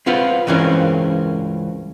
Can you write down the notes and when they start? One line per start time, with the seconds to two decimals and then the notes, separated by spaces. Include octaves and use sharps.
0.06 C4 F4 B4 F#5
0.47 C#2 G2 E3 C4 C#4 A#4